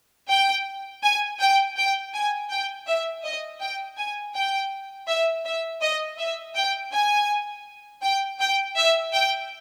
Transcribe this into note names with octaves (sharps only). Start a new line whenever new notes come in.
G5
G#5
G5
G5
G#5
G5
E5
D#5
G5
G#5
G5
E5
E5
D#5
E5
G5
G#5
G5
G5
E5
G5